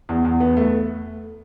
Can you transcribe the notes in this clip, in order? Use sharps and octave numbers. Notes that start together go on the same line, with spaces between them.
E2
E2
B3
A3